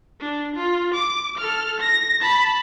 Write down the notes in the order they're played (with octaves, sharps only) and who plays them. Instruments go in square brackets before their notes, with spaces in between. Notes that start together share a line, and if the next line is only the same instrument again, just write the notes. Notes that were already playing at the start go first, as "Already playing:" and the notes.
[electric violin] D4
F4
D6
A4 F6
A#6
A5 B5